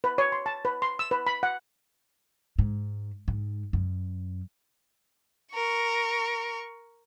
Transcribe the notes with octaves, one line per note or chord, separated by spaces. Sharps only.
B4
C#5
C6
A5
B4
C6
E6
B4
B5
F#5
G#2
G#2
F#2
A#4 C#6